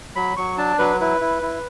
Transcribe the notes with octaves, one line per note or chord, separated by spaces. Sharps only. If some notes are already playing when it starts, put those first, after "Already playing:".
F#3 B5
F#3 C#6
D4 A5
F#3 B4
E4 B4
E4
E4